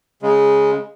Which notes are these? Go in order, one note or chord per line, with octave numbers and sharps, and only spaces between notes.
C#3 G#3